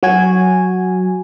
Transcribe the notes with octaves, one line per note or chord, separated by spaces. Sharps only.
F#3 F#4 G#5